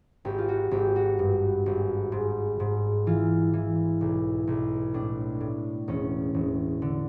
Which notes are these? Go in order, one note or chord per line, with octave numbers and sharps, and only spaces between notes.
G#1 G4
F4
F#4
G#1 G4
F#4
G2
G#1
G#2
G#2
E3 F4
E3
B1
B1
A2 D4
A2
E1 C#4
E1
D3